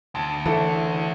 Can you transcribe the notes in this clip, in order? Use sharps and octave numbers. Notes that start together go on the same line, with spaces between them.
D2 A5
F#1 E3 A4 E5